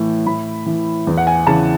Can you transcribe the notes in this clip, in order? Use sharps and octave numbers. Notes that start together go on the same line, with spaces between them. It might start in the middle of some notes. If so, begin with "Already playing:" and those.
Already playing: A2 E3
A2 B5
E3
E2
F#5
G#5
C#3 E3 A5